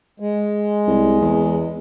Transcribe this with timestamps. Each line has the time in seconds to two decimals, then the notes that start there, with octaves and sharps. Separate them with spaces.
0.20 G#3
0.88 C2
1.21 E2